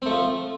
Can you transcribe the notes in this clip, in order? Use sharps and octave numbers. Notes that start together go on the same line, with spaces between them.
F3 A3 C4